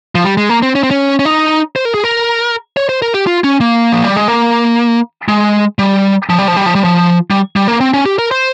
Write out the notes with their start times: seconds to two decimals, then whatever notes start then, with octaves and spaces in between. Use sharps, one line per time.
0.15 F3
0.24 G3
0.37 G#3
0.49 A#3
0.62 C4
0.75 C#4
0.83 C4
0.91 C#4
1.19 C#4
1.25 D#4
1.76 C5
1.85 A#4
1.94 G#4
2.04 A#4
2.77 C#5
2.89 C5
3.02 A#4
3.14 G4
3.27 F4
3.44 C#4
3.60 A#3
3.92 F3
4.04 G3
4.16 G#3
4.28 A#3
5.28 G#3
5.79 G3
6.30 F3
6.39 G3
6.48 F3
6.56 G3
6.66 F3
6.75 G3
6.84 F3
7.30 G3
7.56 G3
7.68 A#3
7.80 C4
7.94 C#4
8.06 G4
8.19 A#4
8.31 C5